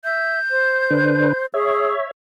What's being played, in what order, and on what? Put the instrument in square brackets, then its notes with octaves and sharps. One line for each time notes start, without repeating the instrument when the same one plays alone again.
[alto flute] E5 [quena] G6
[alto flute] C5
[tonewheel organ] D3 D4 B4
[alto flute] G#4 [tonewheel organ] C#5 E5